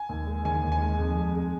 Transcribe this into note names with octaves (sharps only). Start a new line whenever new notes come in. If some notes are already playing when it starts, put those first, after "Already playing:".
Already playing: G#5
D#2
G#3
D#3 G#5
D#2
G#5
G#3
F2
G#3
G#3